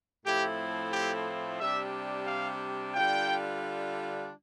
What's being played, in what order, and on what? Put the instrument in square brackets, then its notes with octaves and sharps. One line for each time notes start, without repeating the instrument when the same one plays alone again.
[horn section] A2 F3 A3 C4 E4 G4
G4
C3 G3 D4 E5
F5
D3 G3 D4 F4 G5